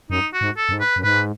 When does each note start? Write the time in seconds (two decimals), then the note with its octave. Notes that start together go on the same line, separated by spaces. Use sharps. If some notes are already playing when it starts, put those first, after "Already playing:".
0.10 F#2 D#4
0.33 F#4
0.41 G#2
0.57 A4
0.69 F#2
0.73 G#2
0.80 B4
0.96 F#2
1.04 G#2 B4